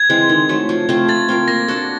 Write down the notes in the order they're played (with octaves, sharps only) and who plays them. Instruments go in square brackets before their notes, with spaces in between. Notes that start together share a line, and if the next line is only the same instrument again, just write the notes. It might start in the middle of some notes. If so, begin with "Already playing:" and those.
Already playing: [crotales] G#6
[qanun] E3 G#3 C4
D#3
F#3 A3
F3
A3 C4 F4
[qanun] A3 [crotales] A6
[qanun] C4 F4 A#4
[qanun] A#3 [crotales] A#6
[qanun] D4 F#4 A4